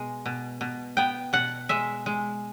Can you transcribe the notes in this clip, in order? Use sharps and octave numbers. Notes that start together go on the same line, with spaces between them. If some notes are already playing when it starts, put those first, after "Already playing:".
Already playing: B2 G#3
B2
B2
B3 G5
B2 F#5
G#3 E5
G#3